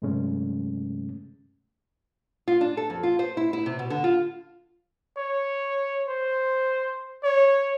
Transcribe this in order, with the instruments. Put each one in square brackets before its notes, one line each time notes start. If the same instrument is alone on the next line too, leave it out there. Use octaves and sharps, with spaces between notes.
[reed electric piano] G2 C3 F#3 G#3 A3 C#4
[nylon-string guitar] F4
D4
A4
F2
F4
C5
E4
E4
C3
B2
D3
F4
[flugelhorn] C#5
C5
C#5